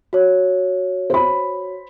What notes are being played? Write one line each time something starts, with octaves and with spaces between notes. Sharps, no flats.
F#4 C#5
C5 B5